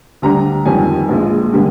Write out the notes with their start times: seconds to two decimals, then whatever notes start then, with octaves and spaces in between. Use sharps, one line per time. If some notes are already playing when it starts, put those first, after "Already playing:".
0.22 D2 D3 G3 D4 A#5
0.66 F2 D#3 G3 G#5
1.09 A#1 A#2 G#3
1.53 D3 G3 A#3